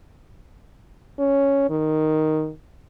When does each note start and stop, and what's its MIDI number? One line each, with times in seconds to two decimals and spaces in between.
1.19 1.65 61
1.70 2.50 51